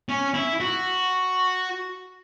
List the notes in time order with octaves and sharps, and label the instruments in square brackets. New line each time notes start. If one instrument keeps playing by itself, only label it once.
[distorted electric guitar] C#4
E4
F#4